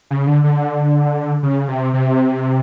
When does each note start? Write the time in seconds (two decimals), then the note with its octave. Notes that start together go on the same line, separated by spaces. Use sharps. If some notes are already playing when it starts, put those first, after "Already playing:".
0.11 C#3
0.27 D3
0.44 D3
1.43 C#3
1.68 C3
1.93 C3